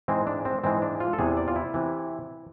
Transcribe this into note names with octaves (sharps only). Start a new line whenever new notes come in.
G#2 E3 G#3 C4
D4
C4
G#2 E3 G#3 C4
D4
F4
A4
E2 C3 E3 G#4
D5
F4
E4
C3 E3